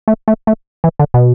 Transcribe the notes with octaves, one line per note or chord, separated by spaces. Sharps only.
A3
A3
A3
E3
D3
B2